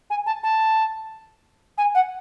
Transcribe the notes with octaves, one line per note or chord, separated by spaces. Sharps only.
G#5
A5
A5
G#5
F#5